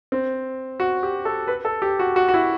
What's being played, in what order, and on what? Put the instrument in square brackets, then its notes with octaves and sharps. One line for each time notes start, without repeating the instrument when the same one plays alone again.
[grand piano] C4
F#4
G4
A4
B4
A4
G4
F#4
F#4
F#4
E4